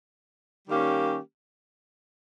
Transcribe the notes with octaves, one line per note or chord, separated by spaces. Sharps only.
D#3 G3 A#3 C#4 G4